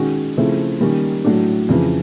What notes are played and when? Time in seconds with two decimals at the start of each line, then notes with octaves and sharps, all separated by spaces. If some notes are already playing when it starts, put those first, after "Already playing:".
Already playing: D#3 G#3 C#4 F#4
0.37 C#3 F3 A3 C4 E4
0.81 D#3 G3 A#3 C#4
1.25 A2 F#3 A3 D4
1.69 F2 C#3 E3